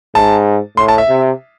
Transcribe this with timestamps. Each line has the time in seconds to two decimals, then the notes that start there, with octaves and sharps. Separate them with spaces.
0.15 G#2 A5
0.77 A2 C6
0.88 A5
0.98 E5
1.09 C3